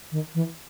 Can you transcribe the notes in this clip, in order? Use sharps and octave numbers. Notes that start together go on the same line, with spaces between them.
D#3
E3